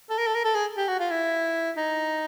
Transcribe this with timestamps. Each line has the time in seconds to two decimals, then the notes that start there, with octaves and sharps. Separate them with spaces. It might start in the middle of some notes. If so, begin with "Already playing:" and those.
0.10 A4
0.18 A#4
0.27 A4
0.35 A#4
0.44 A4
0.55 G#4
0.77 G4
0.88 F#4
0.99 F4
1.11 E4
1.77 D#4